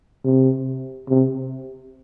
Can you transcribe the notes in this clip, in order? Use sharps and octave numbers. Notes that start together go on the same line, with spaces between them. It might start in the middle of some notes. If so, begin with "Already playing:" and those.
C3
C3